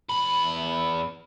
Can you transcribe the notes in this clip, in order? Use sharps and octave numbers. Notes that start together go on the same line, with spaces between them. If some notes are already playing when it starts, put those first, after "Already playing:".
E2 B5